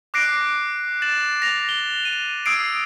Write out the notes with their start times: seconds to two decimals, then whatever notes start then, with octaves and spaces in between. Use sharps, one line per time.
0.14 D6 F#6 A#6 C7 D7
1.02 A6 E7 F#7
1.42 A#6 F7
1.69 G7
2.05 D#7
2.46 D#6 E6 G#6 C7 D7